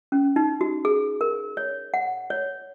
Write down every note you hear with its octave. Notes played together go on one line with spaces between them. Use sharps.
C#4
D#4
F#4
G#4
A#4
C#5
F#5
C#5